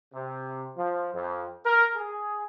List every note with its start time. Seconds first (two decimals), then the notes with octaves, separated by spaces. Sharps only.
0.14 C3
0.77 F3
1.14 F2
1.66 A#4
1.96 G#4